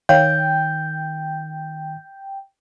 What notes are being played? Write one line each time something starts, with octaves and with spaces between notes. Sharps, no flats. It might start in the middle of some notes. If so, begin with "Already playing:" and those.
D#3 C#5 F5 G5 G6